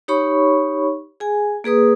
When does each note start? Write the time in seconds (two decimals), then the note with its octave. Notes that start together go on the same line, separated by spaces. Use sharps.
0.08 D#4 G4 C#5 B5 C#6
1.20 G#4 G#5
1.64 A#3 G#4 B4 D#6